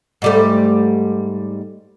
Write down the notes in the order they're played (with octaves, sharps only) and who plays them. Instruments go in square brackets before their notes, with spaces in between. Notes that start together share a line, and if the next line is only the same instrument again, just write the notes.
[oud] G#2 G3 A3